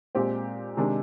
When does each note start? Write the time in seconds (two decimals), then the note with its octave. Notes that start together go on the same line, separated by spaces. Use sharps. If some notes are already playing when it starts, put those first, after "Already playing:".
0.15 A#2 G#3 C4 G4 C5
0.77 C3 D#3 G#3 D4